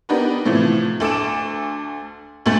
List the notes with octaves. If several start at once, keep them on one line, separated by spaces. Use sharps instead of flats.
B3 D4 D#4 G4 A#4 B4
A2 C3 E3 F3 A3
D2 A4 D6 D7 E7
D2 B2 A3 A6 F#7